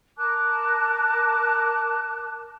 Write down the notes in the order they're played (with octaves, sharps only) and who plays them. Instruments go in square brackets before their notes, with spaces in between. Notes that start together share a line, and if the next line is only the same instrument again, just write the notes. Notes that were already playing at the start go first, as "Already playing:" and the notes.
[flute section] A#4 A5 D6 F#6